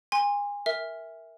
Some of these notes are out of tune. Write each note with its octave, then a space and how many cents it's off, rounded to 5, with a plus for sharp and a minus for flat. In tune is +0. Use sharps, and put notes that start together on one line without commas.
G#5 -30 C6 +0
A#4 +0 E5 -10